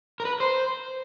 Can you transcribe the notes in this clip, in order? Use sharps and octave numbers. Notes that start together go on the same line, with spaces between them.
A#4
B4
C5